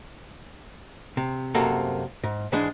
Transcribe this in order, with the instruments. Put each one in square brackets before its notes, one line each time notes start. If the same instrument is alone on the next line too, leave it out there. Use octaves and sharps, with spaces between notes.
[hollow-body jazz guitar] C3
C2 F#2 C3 A#3 F#4 A4
G#2
G#2 E3 G#3 D4 G#4